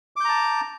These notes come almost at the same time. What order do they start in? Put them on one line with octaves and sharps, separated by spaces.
D6 G6 A#5 A5